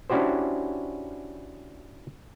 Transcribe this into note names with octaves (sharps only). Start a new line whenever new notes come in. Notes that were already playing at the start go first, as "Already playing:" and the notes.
C#4 D4 E4 F#4 G4 C5